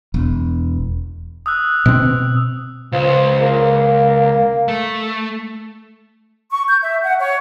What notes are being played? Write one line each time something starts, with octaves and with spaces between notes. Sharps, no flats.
E1
D#6 E6 F#6
B2 C4
C#2 F3
A#3
A3
C#6
G6
E5
F#5
C#5